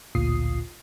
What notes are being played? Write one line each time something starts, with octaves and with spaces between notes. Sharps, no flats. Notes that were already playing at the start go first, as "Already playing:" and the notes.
A1 D2 A#2 F4 D#6 C7